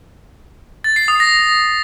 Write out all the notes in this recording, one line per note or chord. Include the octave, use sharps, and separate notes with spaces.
A6
C7
D#6
A#6